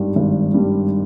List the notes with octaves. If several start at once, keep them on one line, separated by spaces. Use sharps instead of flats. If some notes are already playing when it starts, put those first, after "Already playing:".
Already playing: G#1 G2 D#3 G3
G#1
G2 D#3 G3